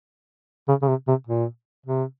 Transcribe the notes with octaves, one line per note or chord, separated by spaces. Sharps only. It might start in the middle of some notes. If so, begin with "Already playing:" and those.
C#3
C#3
C3
C3
A#2
C3